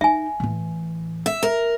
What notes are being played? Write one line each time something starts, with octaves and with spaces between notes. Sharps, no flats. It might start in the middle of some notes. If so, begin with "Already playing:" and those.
D#4 E5 G#5
A2 E3
E5
A#4